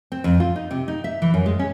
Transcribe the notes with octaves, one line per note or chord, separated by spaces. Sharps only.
C4
F2
F4
D#4
C3
D#4
E5
E3
F#2
G#3
C#4